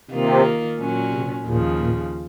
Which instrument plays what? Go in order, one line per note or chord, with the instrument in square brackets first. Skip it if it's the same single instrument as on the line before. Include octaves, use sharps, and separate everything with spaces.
[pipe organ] C3 [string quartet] D#3 A#3 F4
[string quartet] A#2 F#3 C#4
[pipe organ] C3
[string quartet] D#2 C#3 F3 [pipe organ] A#2
[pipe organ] A#2